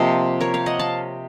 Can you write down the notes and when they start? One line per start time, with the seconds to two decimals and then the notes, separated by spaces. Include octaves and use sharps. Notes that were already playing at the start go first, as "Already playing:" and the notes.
Already playing: C3 F3 A#3 C5 D#5
0.40 A#4 C#5
0.54 C#5 F5
0.66 D#5 F#5
0.79 F5 A5